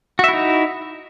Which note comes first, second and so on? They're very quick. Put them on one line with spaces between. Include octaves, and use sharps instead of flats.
F#4 E5 E4 D#4